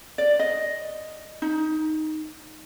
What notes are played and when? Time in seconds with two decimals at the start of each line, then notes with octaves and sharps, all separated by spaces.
0.18 D5
0.39 D#5
1.42 D#4